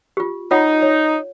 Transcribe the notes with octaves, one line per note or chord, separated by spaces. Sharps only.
F4 G4
D#4 F4 C#5 F#5
C#5